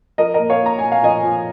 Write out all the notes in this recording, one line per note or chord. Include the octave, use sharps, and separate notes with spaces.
F3 A#4 D#5
A#2 A#4 D#5
C#5 F5
A#2 A#5
A#2 G#5
F5
F3 D#5 G#5
F3